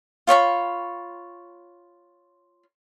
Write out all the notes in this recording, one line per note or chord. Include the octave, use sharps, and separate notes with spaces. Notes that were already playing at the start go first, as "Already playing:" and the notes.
F4 C#5 B5 C#6